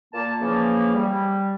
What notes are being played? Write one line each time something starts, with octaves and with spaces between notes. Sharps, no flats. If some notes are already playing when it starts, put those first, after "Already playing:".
A#2 A#3 A5
C#3 E3 F3 A#3
G3